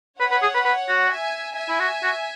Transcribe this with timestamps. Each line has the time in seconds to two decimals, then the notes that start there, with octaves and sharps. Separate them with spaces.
0.20 B4 C#5 F#5
0.31 B4
0.42 G#4
0.55 B4
0.65 B4
0.89 F#4
1.11 E5 G#5
1.57 E5 G#5
1.69 E4
1.80 F#4
2.03 F#4